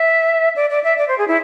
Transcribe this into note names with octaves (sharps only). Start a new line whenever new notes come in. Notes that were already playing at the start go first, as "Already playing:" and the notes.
Already playing: E5
D5
D5
E5
D5
C5
G#4
E4